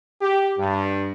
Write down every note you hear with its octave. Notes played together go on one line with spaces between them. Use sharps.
G4
G2